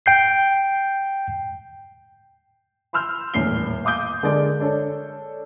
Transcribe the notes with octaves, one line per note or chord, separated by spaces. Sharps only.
G5 G6 C7
B5 C6 E6 F6 G6
D#1 E2 A2 C7 G7
F5 D6 D#6 G6
D3 G#3 A#4 D5
D4 A4 C#5